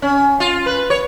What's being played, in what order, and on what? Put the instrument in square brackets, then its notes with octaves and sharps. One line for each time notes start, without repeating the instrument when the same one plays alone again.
[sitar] C#4
F4
B4
C#5